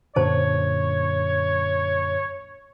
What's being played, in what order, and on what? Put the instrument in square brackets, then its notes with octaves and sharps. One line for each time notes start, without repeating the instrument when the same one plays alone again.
[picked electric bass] F#2 A#2 D3 [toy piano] C5 A5 [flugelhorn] C#5